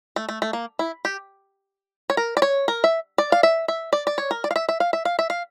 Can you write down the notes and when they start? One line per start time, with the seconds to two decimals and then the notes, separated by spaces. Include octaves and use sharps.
0.16 A3
0.29 A3
0.42 A3
0.53 A#3
0.79 E4
1.05 G4
2.10 C#5
2.17 A#4
2.37 D5
2.42 C#5
2.68 A#4
2.84 E5
3.18 D5
3.32 F5
3.43 E5
3.68 E5
3.93 D5
4.07 D5
4.18 C#5
4.31 A#4
4.44 D5
4.51 F5
4.56 E5
4.69 E5
4.80 F5
4.93 E5
5.05 F5
5.19 E5
5.30 F5